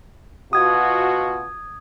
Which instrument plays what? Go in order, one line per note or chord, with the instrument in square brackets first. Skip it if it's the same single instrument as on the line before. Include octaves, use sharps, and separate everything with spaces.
[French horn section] B2 F4 F#4 [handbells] D#6 G#6